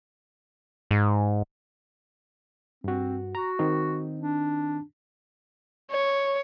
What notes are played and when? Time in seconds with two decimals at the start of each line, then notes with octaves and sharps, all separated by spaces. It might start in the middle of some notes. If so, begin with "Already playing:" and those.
0.91 G#2
2.84 G2 C4 F#4
3.35 F#4 A#5
3.59 D#3 C4 D#4
4.21 D4
5.91 C#5